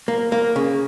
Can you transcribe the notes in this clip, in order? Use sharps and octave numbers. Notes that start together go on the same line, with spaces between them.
A#3
A#3
C#3